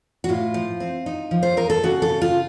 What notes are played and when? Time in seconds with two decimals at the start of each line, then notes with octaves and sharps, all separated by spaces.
0.24 F#4
0.29 A2 F4
0.54 F3
0.80 C4
1.06 D#4
1.31 F3
1.43 C5
1.57 D#4 A#4
1.70 A4
1.83 C#3 F#4
2.02 A4
2.09 C#3
2.22 F4